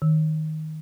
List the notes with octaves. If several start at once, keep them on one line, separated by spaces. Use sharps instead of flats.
D#3